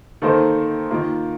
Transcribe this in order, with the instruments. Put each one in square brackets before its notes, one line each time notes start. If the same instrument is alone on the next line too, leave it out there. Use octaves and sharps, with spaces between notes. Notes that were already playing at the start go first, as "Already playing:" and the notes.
[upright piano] D#3 A#3 D#4 A4 C5
D#3 A#3 F4